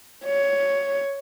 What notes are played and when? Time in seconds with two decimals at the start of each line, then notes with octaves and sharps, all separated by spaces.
0.25 C#5